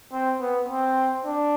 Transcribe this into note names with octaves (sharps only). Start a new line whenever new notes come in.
C4
B3
C4
D4